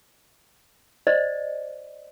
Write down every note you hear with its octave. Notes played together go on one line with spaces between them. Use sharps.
C5 D5 D#5